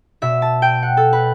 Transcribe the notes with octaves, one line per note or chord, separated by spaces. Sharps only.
B2 E5
A5
G5
F#5
A4
B4